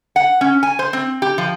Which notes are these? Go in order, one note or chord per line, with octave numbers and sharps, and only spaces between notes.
F#5
C#4
G#5
C5
C4
G4
F3